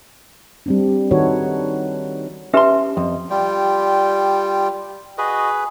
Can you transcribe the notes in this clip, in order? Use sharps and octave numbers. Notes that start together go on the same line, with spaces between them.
G3 C4 D4
D#3 D#4 F#4 A4 B4 C#5
C#4 G4 B4 E5 A5 C6
F2
G3 F4 G5
F#4 G#4 B4 D#5